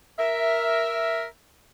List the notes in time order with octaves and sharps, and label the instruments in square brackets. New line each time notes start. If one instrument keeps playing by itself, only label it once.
[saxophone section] A#4 E5